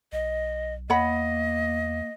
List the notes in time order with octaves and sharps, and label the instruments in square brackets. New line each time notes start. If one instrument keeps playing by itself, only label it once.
[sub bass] B1 [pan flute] D#5
[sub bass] E2 [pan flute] A#3 [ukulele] C#5 F#5 B5 [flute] D#5